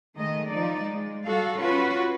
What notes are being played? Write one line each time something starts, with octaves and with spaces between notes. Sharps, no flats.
D#3 G#3 A3 D#5
F3 D#4 D5
G#3
G3 F#4 A4 F5
C#4 F4 F#4 B4 C#5